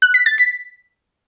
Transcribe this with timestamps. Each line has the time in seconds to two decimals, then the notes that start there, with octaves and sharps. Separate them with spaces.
0.02 F#6
0.14 B6
0.26 A6
0.38 B6